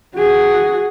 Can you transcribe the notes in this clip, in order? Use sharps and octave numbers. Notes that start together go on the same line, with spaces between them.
F#4 G#4